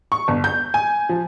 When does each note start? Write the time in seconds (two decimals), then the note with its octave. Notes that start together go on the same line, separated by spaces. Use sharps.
0.12 C#6
0.28 G1
0.44 G6
0.74 G#5
1.09 F3